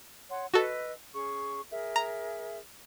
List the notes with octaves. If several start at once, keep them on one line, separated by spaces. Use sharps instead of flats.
C#5 F#5 C6
F#4 A4 B4 D#5 E6
C#4 G#4 C#6
G#4 A#4 E5
A#5